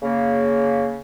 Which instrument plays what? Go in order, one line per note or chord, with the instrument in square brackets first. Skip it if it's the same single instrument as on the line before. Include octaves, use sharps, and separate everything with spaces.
[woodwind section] C#3 A#3